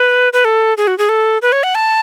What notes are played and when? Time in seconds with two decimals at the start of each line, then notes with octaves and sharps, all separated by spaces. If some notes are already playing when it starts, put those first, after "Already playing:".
Already playing: B4
0.33 B4
0.45 A4
0.77 G#4
0.87 F#4
0.98 G#4
1.09 A4
1.42 B4
1.52 C#5
1.63 F#5
1.75 A5